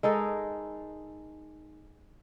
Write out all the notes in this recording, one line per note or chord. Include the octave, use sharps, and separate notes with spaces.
G#3 D#4 A4 A#4